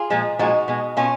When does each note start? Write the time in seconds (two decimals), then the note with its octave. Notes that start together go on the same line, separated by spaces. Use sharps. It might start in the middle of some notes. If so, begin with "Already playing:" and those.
Already playing: F4 G#4
0.10 A#2 F3 G#3
0.39 A#2 F3 G#3 D#4 F#4
0.68 B2 G#3
0.97 B2 C#4 F4